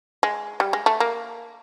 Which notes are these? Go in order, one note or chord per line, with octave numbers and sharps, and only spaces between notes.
G#3
G3
G#3
A3
A#3